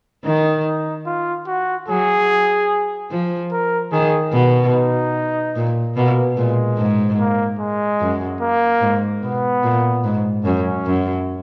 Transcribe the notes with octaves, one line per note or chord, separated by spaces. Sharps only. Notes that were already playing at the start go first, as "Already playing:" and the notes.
D#3 D#4
D#4
F4
F#4
F#3 G#4
F3
A#4
D#3 G#4
B2
D#4
A#2
B2 A#3
A#2 G#3
G#2
A#3
G#3
F#2
A#3
G#2
B2 B3
A#2
G#2
F#2 C#4
F#2